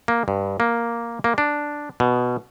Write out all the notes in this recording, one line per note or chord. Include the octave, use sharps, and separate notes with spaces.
A#3
G2
A#3
A#3
D4
B2